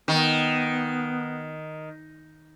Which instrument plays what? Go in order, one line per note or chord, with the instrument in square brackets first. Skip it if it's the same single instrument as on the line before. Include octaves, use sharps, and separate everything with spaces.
[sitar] D#3 [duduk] B3